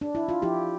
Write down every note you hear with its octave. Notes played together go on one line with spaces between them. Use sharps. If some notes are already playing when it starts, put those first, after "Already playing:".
D4
E4
F4
F3 E4 G4